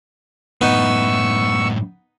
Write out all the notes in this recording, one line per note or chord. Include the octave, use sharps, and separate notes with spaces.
F#2 A2 B3 D#4 C#6 E6